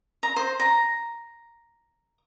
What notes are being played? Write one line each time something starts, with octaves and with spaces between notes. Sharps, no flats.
A#5
C5
A#5